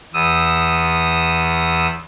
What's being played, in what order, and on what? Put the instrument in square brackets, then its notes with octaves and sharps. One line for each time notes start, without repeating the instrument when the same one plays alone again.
[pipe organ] E2 D#6 E6